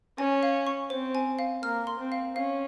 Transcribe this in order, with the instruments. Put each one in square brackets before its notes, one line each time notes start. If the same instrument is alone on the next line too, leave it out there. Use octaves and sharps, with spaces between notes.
[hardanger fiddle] C#4 [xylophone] G#5
[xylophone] F5
C#6
[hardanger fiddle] C4 [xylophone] C5
[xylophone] G#5
F5
[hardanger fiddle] A#3 [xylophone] F6
[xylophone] C6
[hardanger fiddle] C4
[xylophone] F5
[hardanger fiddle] C#4 [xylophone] F5